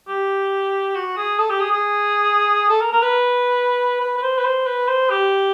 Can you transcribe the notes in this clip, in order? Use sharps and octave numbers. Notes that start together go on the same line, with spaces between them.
G4
F#4
G#4
A4
G4
G#4
G#4
A4
A#4
A#4
B4
B4
B4
C5
B4
C5
B4
C5
G4